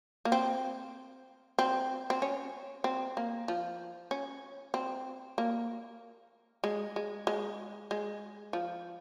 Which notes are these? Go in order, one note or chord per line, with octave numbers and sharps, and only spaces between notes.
A#3
C4
C4
C4
C#4
C4
A#3
F3
C#4
C4
A#3
G#3
G#3
G#3
G#3
F3